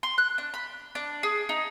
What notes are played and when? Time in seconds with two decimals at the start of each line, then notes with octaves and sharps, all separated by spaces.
0.03 C6
0.18 F#6
0.38 D4
0.54 B5
0.95 D4
1.23 G#4
1.49 D#4